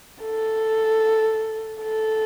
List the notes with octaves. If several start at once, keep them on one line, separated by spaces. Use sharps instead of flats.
A4
A4